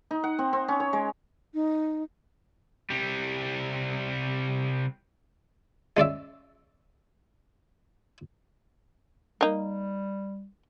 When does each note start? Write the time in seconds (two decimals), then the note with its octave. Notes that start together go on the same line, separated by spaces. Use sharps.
0.11 D#4
0.24 F#5
0.39 C4
0.53 C4
0.68 C#4
0.80 C#5
0.93 G#3
1.54 D#4
2.90 C3 G3
5.97 G#3 C#4 D5 E5
9.41 G3 A#3 D#4